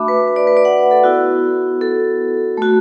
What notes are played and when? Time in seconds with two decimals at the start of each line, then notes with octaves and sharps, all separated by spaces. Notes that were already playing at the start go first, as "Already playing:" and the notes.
Already playing: A3 D4 F#4 E5 A5 B5 D6
0.08 B4
0.28 B4
0.36 D5
0.47 B4
0.57 D5
0.65 F#5
0.91 A4
1.03 B3 E4 F#4
1.81 A4
2.57 A3 F#4